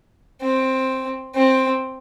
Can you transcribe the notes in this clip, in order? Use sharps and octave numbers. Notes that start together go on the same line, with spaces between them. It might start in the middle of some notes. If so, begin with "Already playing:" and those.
C4
C4